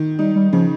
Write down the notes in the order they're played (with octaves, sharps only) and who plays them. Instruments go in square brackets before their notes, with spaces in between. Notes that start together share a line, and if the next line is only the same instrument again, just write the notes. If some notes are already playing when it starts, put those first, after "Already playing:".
Already playing: [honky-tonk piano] D#3
[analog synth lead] G3 [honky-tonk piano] D#4
[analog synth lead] G3
[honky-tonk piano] C#3 [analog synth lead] F3